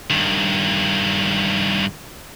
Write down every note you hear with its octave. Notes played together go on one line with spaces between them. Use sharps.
G2 D#3